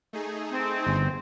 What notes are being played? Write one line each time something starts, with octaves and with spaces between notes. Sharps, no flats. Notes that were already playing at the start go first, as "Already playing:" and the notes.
A3 D#4 G#4
C4
G1